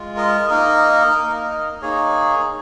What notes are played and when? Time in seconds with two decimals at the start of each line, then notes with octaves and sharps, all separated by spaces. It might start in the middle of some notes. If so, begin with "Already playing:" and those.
Already playing: G#3 F4
0.16 A#4 D#5
0.50 A#3 D#4 A#4 D#5
1.16 A#3 D#4
1.82 A#3 D#4 G#4 C#5